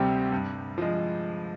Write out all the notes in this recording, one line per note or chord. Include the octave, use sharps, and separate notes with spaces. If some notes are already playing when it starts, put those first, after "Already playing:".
Already playing: D2 C3 G3 C4 G4
G2
F3 G#3